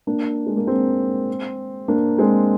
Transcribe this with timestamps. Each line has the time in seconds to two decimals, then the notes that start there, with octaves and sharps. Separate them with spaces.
0.07 A#3 D4
0.46 G#3
0.57 A#3
0.67 G#3 C4
1.88 A#3 D4
2.18 G#3 C4